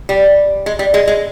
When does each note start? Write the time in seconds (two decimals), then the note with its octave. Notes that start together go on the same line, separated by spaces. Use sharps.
0.09 G3
0.66 G#3
0.79 G3
0.94 G#3
1.07 G#3